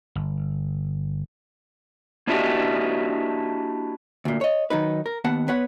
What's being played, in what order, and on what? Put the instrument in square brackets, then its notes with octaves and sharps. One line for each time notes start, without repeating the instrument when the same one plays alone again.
[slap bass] G1
[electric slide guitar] A#3 D4 E4 F#4 G4 D#5
[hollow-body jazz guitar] D2 A#2
C#5 D#5
D#3 F#3 D#4 B4
A#4
D#2 B3 F#5 A5
B3 B4 C#5 F#5